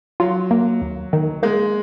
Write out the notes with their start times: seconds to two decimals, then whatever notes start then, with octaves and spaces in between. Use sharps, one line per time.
0.20 F#3 F4
0.51 A#3
0.81 D#2
1.13 D#3
1.43 G#3 A#3